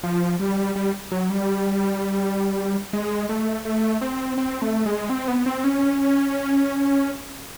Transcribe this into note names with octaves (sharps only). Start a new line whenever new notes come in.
F3
G3
G3
F#3
G3
G#3
A3
A3
C4
C4
A3
G#3
C4
B3
C4
C#4